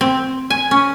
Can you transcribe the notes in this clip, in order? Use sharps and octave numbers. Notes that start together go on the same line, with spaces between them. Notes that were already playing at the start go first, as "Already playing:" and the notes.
C4
G#5
C#4